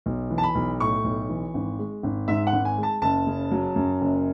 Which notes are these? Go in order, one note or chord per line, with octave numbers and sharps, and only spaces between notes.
B1
E3
A5
B5
B1
A2 C#6
B1
E3
G#1
G#3
G#1
G#2 E5
F#5
G#1
G#5
G#3
A5
F#1 A5
C#3
F#3
F#2
F#1